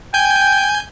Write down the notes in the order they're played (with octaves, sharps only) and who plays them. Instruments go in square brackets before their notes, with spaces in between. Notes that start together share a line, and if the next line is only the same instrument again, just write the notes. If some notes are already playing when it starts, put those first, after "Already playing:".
[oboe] G5 [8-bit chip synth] G#5 G6